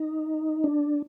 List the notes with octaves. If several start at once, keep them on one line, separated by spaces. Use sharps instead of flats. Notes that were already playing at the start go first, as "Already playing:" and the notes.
Already playing: D#4
D4